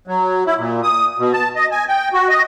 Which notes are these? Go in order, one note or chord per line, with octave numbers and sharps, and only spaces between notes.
F#3
E4
A#2
D#6
B2
A5
D#5
G#5
G5
F#4
D#5